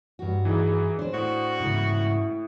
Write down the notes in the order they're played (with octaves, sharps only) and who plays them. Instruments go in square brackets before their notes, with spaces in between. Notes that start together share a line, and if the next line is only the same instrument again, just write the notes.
[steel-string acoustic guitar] G2 F#4
[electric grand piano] E3 D#4 G#4
[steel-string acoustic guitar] D4 C5
[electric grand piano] A2 [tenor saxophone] F#4
[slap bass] G#2 C#3 E3 [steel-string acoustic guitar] E4